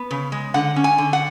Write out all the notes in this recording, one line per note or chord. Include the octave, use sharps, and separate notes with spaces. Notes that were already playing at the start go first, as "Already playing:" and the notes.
Already playing: B3
C#3
G#3
D3 F#5
C#4
G#5
D3
F#5